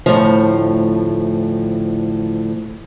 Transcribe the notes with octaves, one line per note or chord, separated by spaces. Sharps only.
D2 A2 F3